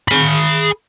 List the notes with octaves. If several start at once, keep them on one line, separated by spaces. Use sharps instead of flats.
G#4 B5